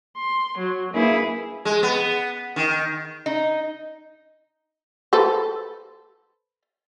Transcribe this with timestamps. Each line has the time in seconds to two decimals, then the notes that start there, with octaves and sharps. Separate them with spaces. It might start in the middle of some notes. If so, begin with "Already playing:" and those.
0.18 C6
0.59 F#3
0.93 A#3 E4 G#4 B4
1.65 G#3
1.83 B3
2.56 D#3
3.26 D#4
5.13 A4 B4 C5